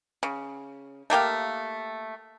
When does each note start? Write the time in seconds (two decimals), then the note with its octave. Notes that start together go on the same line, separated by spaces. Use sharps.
0.23 C#3
1.10 A3 A#3 G4 F5